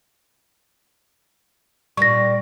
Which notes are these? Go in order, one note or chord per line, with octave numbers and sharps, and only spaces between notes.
A#2 G3 C#6 A#6